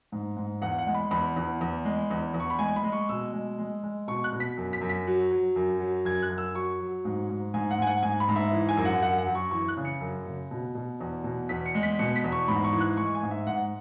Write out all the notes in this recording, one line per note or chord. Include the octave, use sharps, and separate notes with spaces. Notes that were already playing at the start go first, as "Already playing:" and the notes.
G#2
G#2
E2 F#5
F#5
G#3
B5
E2 B5
E2
E2
G#3
E2
E2
C#6
B5
G#3 G#5
B5
G#3
C#6
B2 E6
G#3
G#3
G#3
B2 C#6
F#6
B2
B6
F#2
B6
F#2
B6
F#3
F#3
F#2
F#3
F#2 G#6
F#6
F#2
E6
F#3 C#6
F#3
G#2
G#2
G#2 G#5
F#5
G#2 G#5
F#5
G#2 G#5
B5
G#2
E5
E3
G#5
F#2
F#5
F#2 F#5
F#5
F#2
C#6
E3 C#6
F#6
C#3
C#7
F#2
C#3
B2
B2
E2
B2
E2 B6
C#7
G#3
B6
B2 C#7
B6
E2
C#6
G#2 B5
C#6
E3
F#6
G#3 C#6
G#5
G#2
E5
G#2 F#5